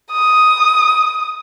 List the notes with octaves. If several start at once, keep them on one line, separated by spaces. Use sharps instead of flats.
D#6